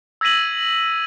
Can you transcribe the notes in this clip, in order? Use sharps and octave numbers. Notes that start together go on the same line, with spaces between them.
E6 G#6 A#6 B6 D#7 F#7